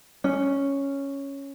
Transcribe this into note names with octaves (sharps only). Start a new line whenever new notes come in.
C#4